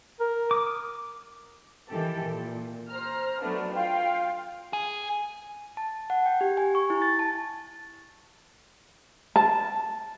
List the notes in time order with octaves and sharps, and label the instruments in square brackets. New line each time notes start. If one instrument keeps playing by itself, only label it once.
[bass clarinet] A#4
[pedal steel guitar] D6 D#6
[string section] D#3 E3 G4 A4
A#2
C5 A#5 F6
F#3 A3 B3 D4
F4 F5 G5
[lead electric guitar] G#4
[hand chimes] A5
F#5
G5
G4
G#5
C#6
E4
A6
A5
[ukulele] A5